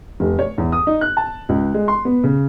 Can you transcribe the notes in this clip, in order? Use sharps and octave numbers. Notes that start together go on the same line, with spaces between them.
F1
C#5
E2
D#6
D#4
F#6
A5
C#2
G#3
C6
B3
C#3